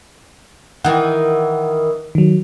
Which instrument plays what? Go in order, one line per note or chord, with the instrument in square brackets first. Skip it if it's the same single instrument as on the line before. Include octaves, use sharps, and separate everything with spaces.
[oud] D#3 E3 [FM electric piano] F#5
[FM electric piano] D#3 F#3